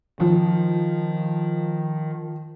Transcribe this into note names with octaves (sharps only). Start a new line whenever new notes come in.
D#3 F3